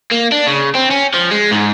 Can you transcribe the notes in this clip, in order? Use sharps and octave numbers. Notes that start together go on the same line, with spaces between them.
A#3
D4
C#3
C4
C#4
F3
G#3
G#2